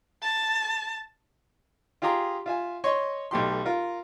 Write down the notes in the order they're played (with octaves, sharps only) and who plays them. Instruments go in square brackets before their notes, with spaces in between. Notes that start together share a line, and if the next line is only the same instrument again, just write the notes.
[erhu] A5
[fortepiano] F4 G4 G#4 A#5 C6
F4 E5 G#5
C#5 D#5 C6 C#6
B1 A3 G4 C6
F4 A#4